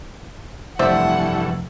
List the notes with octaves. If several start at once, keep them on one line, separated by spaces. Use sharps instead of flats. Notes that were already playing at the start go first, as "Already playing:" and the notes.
F1 G2 E3 A3 C5 D5 E5 F#5